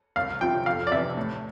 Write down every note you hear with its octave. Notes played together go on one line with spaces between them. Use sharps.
C2 F5
C3 F3 G5
F2 F5
D5
C3 E3 E5
A2